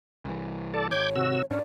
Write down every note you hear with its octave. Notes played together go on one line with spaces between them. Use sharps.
C2 E3
A4 D5 A5
G#1 C#5 D6 G6 G#6
C3 F#4 E6
G#2 C#4 D4 D5